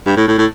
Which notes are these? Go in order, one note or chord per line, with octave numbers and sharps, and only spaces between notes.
G2
A2
A2
A2